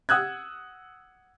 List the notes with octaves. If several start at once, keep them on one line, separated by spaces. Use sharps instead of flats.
F#5 D#6 E6 F#6 G#6